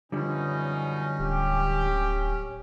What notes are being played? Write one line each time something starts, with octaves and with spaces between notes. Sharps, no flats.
F#2 B2 D3 F3 G3 C#4 D#4
D1 G4